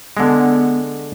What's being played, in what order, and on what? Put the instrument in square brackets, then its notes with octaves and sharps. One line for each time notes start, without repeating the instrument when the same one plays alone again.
[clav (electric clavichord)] D3 G#3 [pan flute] B3